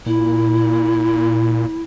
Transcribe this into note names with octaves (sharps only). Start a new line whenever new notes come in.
A#2 E4